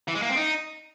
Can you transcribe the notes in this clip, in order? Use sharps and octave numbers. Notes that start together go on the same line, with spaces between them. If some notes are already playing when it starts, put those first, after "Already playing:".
E3
G#3
A#3
C4
D#4